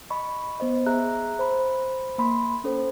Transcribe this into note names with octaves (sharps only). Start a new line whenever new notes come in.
D#5 B5 C#6
B3 C5 D#5
G#4 E5 A#5 F#6
C5 B5
A#3 B5 C6
C#4 A4 C5